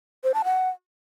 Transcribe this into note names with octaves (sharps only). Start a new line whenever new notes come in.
C5
A5
F#5